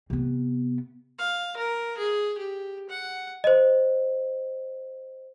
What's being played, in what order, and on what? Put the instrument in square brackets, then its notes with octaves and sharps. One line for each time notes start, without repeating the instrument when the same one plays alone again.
[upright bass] C3 B3
[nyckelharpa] F5
A#4
G#4
G4
F#5
[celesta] C5 D#5